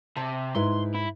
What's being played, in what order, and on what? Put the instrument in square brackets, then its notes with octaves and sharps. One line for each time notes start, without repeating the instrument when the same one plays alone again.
[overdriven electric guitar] C3 [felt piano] A5
[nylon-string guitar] G#2 [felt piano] D#4 E4 B4 [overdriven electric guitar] C6
[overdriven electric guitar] E4